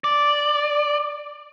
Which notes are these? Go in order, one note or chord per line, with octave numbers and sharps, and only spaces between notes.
D5